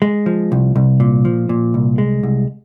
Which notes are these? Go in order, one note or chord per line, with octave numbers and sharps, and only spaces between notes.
G#3
F3
C2
C2
A#2
F3
A#2
C2
G#3
C2